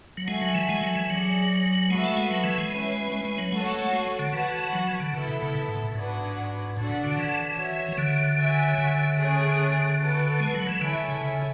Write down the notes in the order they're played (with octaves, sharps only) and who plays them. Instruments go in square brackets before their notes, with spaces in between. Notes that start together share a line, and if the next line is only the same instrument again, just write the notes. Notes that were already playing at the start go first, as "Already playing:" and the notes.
[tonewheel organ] F#3
[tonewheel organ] G#3 [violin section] F#4 A4 E5 G#5
[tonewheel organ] F#3
E3
G#3
F#3
E3
[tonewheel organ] F#3 [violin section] C#4 G#4 D5
[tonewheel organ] G#3 [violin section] B3 F#4 A4 E5
[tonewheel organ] A3
G#3
F#3
E3
G#3
[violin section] C#4 E4 B4
[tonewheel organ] G#3
G#3
F#3
[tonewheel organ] G#3 [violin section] F#4 A4 C#5 F#5
[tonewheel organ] A3
A3
G#3
D3
[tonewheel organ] E3 [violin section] F#4 B4 F#5 A5
[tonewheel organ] F#3
E3
D3
[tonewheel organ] C#3 [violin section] B3 E4 A4
[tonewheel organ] B2
C#3
B2
G#2
A2
[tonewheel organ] G#2 [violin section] B3 D4 F#4 B4 F#5
[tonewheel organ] A2 [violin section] D4 F#4 A4 D5 F#5
[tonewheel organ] B2
D3
E3
[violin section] F#4 C#5 E5
[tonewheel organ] E3
D3
[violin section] F#4 C#5 E5 G#5
[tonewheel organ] D3
[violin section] A3 C#4 G#4
B3 F#4 A4
[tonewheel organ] G#3
F#3
E3
[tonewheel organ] D3 [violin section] E4 A4 C#5 E5 G#5
[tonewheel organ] C#3
C#3